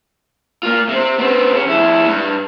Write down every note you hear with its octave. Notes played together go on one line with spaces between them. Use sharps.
A#3 F4
C3 C4
B3 C4
C3 C#4
F2 E4
G2